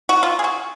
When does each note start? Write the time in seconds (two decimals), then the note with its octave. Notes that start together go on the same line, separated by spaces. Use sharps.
0.09 F#4
0.23 F4
0.39 G#4
0.44 F#4